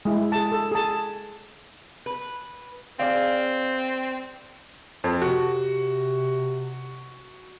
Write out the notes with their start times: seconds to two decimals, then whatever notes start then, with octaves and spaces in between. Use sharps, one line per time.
0.05 G#3 E4
0.32 G#4 A5
0.52 A4
0.72 G#4 A5
2.06 B4
2.99 C4 G#4 D5 F5
5.04 F2
5.22 C3 F#4